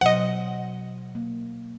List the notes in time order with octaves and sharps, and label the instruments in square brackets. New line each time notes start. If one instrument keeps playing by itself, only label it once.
[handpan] B2 F#3 C5 [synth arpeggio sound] D#5 F#5
[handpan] A#3